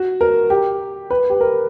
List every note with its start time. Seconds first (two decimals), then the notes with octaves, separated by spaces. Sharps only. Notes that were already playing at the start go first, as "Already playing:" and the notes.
Already playing: F#4
0.21 A#4
0.50 G4
1.10 B4
1.30 G4
1.41 A#4